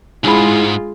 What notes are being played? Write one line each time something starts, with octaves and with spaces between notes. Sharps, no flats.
B1 G#2 G#3 D4 E4 F4 G#5 B5